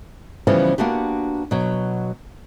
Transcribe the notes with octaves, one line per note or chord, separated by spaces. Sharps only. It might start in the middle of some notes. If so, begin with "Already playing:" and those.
C#3 E3 F3 G3 B3 C#4
A#3 B3 D4 F#4 G4
B2 F#3